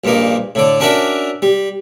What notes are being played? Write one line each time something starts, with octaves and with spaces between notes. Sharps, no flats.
A#1 G2 A#2 A#3 D#4
A2 D3 D5
C#4 D4 F#4 A#4 D5 E5
G3